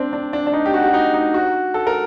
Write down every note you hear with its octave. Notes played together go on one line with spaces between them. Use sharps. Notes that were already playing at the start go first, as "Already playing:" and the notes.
Already playing: C4 D4
D4
D4
D4
D#4
G4
F#4
F#4
D#4
D#4
F#4
A4
A#4